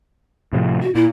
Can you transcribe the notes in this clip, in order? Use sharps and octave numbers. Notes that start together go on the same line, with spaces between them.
A2 C3 F3
F#4
A#2 E4